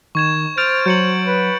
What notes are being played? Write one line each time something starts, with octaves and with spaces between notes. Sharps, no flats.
D#3 C#6 G#6 E7
C5 F6 G6 A6 D7
F#3 G6 C#7 F#7
B4